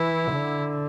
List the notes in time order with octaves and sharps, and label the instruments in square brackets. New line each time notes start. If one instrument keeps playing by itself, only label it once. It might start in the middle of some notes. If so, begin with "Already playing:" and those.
Already playing: [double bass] E3 [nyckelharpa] E4
[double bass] D3